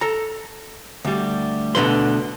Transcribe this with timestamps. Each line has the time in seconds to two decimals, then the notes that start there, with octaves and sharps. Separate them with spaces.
0.01 A4 A#5
1.05 D2 G3
1.75 D2 B2 D3 E3 B4 C6